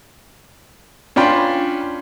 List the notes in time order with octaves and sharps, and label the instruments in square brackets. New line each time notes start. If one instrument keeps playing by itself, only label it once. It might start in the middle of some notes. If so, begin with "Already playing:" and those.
[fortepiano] C#4 D4 F4 G5 B5 C6